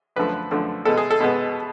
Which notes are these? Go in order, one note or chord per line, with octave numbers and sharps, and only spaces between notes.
F#2 D3 F3 A3 B4
F#2 D3 F3 A3
B2 G#3 B3 A4
G#4
A4
B2 G#3 B3